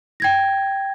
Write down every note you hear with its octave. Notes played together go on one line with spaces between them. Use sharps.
G5 G#6 A#6